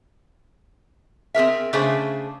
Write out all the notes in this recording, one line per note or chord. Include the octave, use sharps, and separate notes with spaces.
C4 G#4 A#4 E5
C#3 A3 D4 G#4 C5 E5